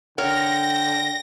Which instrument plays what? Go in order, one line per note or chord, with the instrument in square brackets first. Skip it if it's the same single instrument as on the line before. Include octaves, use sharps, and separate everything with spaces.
[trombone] D3 [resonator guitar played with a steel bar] A#4 C#5 F#5 [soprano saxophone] G5 [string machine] A#6